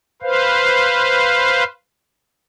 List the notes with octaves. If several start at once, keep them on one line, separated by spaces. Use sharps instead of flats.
B4 C5 F5